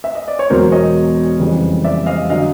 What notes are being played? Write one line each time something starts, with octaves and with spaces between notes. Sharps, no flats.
E5
D#5
D5
C#5
E1 E2 B2 F#3 A#4 C5
C#5 D#5
F2 C#3 E3 G3
D5 E5
D#5 F5
D3 F#3 D#5 F5